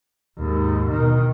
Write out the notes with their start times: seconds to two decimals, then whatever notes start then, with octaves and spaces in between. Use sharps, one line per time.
0.38 D#2 G#2
0.90 B2 D#3